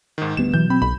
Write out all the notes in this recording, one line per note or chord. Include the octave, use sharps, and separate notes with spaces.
G#2 D#3
D2 G3 B3 E7
B2 E3 F#3 G6
C4 B5
B1 B5